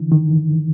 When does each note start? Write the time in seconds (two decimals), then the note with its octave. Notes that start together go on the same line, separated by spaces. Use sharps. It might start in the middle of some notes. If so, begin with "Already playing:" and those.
Already playing: D3 E3
0.12 D#3